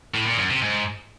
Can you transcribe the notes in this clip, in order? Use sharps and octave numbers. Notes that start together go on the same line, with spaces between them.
A2
A#2
F#2
C3
G#2